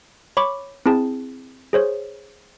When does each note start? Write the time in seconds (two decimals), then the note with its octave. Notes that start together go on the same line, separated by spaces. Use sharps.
0.37 C#5 B5 C#6 D6
0.86 C4 E4 G#4 A5
1.73 G#4 C5 C#5